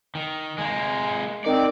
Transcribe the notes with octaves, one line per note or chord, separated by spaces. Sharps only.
D#3
G#3 A#3
D#3 C4 D5